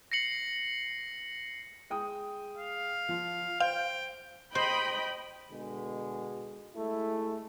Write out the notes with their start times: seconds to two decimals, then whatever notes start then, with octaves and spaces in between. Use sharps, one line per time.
0.12 A#6 C7 C#7 F#7
1.90 G#3 G5 D#6
2.57 F5
3.09 F3 F4
3.60 C5 F5 G5
4.55 C5 D#5 G5 B5
5.51 B2 D3 G#3
6.75 G#3 A3 E4